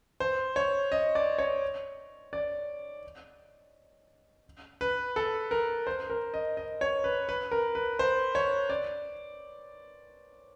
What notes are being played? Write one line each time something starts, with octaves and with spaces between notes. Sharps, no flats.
C5
C#5
D#5
D5
C#5
D5
B4
A4
A#4
C5
A#4
D#5
D#5
C#5
B4
B4
A#4
B4
C5
C#5
D5